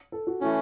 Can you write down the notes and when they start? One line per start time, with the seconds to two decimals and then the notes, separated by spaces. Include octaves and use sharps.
0.12 A4
0.27 F#4
0.41 E3 A3 C#4 E4